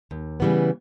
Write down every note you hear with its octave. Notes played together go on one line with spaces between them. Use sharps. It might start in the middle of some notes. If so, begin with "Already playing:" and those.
D#2
C#3 E3 G3 B3